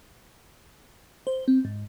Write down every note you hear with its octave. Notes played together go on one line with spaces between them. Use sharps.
C5
C4
G#2